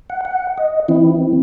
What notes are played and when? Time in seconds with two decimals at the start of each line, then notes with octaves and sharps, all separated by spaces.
0.10 F#5
0.25 F#5
0.58 D#5
0.88 E3 C4 E4